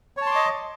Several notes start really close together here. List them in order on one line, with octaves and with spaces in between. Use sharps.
C#5 A5 C6 D6 D#5